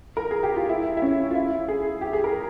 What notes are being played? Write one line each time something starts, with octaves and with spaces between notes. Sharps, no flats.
A#4
G#4
G4
F4
E4
E4
C#4
F4
E4
G#4
G4
G#4
A#4